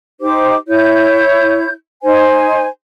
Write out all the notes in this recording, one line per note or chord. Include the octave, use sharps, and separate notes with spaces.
D#4 G4 C5 D6
E4 C#5 G6
D#4 C5 G#5